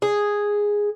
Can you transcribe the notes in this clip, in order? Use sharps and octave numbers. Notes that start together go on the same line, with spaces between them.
G#4